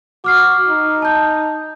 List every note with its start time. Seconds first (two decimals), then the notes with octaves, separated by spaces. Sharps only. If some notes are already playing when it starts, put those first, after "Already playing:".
0.24 F#4 D6 F6 C7
0.69 D#4
1.02 A5 G6